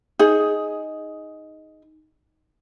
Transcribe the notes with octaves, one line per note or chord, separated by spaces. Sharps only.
D#4 G#4